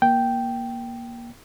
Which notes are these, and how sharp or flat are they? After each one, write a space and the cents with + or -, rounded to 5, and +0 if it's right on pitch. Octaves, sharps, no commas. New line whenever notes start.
A#3 +20 G5 -5